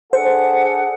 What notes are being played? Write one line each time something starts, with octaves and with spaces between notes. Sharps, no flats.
D4 G#4 A4 C5 F#5